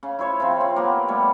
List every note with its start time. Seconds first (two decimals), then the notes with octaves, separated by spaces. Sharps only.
0.03 C#3
0.19 E4 C5 C#5 E5
0.40 C#3 F3 C4
0.61 C4
0.76 A#3 B3 G4
1.08 G3 A3 C#5